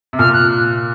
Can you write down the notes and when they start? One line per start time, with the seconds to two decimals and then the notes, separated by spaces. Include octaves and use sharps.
0.13 C3
0.19 A#2 F6
0.33 F#6